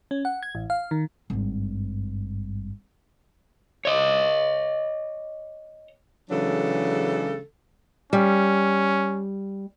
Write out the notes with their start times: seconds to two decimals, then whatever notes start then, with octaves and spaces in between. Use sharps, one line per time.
0.11 C#4
0.25 F#5
0.43 G#6
0.55 A1
0.70 F5
0.91 D#3
1.30 G#1 G2
3.85 C#5 D#5
6.30 C#3 E3 F#3 G#3 D4 A4
8.13 G3 C#4